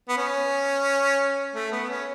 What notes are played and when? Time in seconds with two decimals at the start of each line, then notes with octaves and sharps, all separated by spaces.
0.08 B3
0.18 C#4
1.54 A3
1.72 B3
1.90 C#4